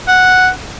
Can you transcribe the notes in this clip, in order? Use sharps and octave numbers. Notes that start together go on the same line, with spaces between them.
F#5